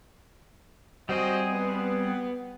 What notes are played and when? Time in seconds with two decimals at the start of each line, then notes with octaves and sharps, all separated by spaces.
1.09 G3 C4 F#4 G#4 C5 D#5
1.52 B3